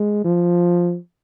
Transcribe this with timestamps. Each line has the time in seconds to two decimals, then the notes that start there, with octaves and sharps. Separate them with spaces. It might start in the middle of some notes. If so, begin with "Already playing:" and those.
Already playing: G#3
0.25 F3